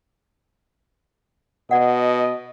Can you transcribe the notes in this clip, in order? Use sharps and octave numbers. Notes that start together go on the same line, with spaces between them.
B2 D5 D#5 F#5